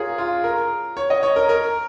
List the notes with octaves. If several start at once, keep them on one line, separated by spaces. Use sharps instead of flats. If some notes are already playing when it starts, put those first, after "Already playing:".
Already playing: F4 G#4 A#4 C#5
F4
A#4
C#5
D#5
C#5
A#4
A#4